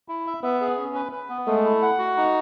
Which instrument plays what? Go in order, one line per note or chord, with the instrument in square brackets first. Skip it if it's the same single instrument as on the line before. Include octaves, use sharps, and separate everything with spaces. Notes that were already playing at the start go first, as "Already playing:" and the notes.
[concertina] E4
E5
[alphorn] B3 [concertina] E5
[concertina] G#4
C#4
B4
B4
B3
[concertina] G#3 [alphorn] A3
[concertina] E4
F#5
F#4
D#4